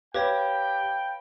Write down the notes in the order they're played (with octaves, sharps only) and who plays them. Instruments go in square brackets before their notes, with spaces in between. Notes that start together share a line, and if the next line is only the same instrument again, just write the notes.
[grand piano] G4 [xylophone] B4 C#5 [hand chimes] F5 B5 [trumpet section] G5